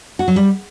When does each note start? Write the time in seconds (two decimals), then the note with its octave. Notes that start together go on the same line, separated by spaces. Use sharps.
0.19 F#4
0.28 F#3
0.36 G3